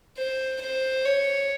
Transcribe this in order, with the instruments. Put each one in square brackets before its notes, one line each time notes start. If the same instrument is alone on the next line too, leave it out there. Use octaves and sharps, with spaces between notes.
[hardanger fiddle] C5
C5
C#5